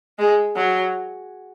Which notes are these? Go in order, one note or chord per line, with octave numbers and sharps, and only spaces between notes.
G#3
F#3